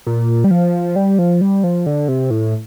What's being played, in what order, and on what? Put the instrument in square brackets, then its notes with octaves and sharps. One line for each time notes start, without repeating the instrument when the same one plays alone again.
[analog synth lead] A#2
G3
F3
G3
F3
G3
F3
D3
C3
A2